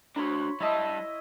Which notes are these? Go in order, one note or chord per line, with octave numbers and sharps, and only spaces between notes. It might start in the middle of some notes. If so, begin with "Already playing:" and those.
D4 F#4 C#5 B5 C6
G3 E4 D#5 E5 A5